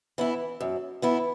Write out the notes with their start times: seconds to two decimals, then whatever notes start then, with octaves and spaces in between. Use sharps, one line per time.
0.18 E3 B3 E4
0.61 F#2
1.02 E3 B3 E4